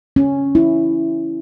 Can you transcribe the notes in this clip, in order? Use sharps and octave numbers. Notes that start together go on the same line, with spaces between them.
C#4
E4